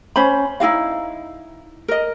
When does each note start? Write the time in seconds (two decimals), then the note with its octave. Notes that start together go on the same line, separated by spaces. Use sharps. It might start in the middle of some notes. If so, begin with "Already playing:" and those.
0.16 C#4 C5 B5
0.60 D#4 E4 F#4 F5
1.88 A#4 D#5